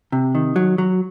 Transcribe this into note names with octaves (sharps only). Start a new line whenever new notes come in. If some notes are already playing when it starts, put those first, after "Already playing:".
C3
D#3
F#3
F#3